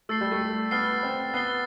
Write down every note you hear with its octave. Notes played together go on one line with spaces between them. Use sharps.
A3 E6 A6 C7 G7
G3
A3
B3 F6 A6 C7 G7
C4
B3 A6 C7 G7